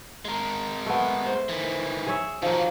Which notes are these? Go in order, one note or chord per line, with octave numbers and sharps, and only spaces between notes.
G#3 A#4
A3 B3
C5
D#3 E3
G#4 C#5 E5
D#3 F3 F#3 A#3